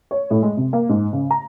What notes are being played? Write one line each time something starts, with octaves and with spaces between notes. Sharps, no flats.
C#5
A2
G#3
C3
A#3
G#2
C#3
A#5